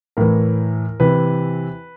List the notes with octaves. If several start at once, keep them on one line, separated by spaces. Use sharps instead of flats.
A2 E3 A#4
C3 E3 B4